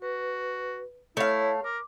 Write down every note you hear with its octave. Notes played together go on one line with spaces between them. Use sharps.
F#4 B4
A3 E4 C#5 F5
A#4 D6